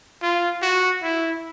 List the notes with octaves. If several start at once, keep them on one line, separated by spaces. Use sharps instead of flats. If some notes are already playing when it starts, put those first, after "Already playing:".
F4
F#4
E4